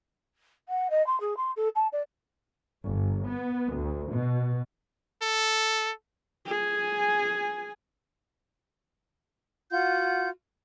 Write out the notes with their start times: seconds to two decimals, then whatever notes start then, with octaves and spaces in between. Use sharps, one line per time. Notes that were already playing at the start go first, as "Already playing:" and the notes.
0.68 F#5
0.90 D#5
1.06 C6
1.20 G#4
1.37 C6
1.56 A4
1.75 A5
1.92 D5
2.85 G1
3.28 B3
3.75 D2
4.13 B2
5.22 A4
6.46 G#4 G#5
9.72 F4 F#4 F#5 G6